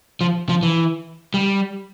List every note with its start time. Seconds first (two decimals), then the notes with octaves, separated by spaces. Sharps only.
0.21 F3
0.49 F3
0.63 E3
1.34 G3